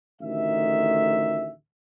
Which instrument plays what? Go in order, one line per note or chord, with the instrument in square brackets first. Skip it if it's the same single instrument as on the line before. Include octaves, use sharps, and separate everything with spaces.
[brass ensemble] A1 D2 D#3 E5